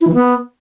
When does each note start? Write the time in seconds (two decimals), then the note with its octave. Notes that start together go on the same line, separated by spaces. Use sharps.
0.01 E4
0.07 E3
0.14 B3